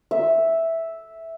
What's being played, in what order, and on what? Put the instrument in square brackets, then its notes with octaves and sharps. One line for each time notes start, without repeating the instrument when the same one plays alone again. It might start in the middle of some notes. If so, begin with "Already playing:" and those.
[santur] E5